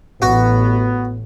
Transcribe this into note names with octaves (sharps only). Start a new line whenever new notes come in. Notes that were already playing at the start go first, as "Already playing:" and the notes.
A1 B3 F#4